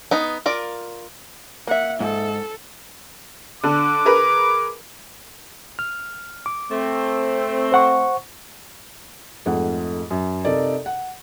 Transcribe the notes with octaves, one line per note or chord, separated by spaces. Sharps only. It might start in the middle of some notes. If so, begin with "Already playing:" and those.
B3 D#4
F4 A#4 D5
A#3 E5 F#5
G#2 A4
D3 D4 D6
G#4 A#4 B4
F6
D6
A3 C4
C5 F#5 C#6
F2 G#2 A3 F#5
F#2
C3 D#4 A4 A#4 D5
F#5